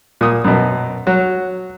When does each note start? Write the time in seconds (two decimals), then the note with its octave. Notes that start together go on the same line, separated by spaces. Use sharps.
0.21 A#2 D#6
0.44 F#2 B2
1.07 F#3